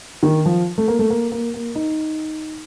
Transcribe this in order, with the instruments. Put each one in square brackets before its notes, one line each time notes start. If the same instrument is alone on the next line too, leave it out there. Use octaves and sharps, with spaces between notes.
[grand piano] D#3
F3
A3
A#3
A3
A#3
A#3
A#3
D#4